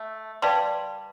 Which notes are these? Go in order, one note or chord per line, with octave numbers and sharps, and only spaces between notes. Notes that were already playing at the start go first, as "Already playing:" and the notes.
Already playing: A3
G3 B4 D5 F5 A5 C6